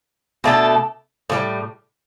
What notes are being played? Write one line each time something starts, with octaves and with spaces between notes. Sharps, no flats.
B2 A3 D4 A4
A2 E3 G3